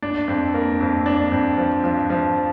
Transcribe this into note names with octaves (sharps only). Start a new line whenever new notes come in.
D4
F2
A#3
F2
D4
F2
F3
F3
F3